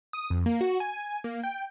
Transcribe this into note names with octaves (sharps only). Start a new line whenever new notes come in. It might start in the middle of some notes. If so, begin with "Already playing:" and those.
D#6
F2
A#3
F#4
G#5
A#3
G5